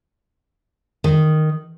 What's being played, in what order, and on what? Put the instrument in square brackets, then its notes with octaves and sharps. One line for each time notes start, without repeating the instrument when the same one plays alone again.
[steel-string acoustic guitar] D#3